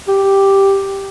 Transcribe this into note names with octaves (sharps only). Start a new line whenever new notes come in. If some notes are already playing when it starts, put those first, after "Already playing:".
G4